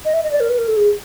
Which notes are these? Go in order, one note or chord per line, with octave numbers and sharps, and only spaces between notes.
D#5
E5
D#5
D5
A#4
B4
A#4
A4
G#4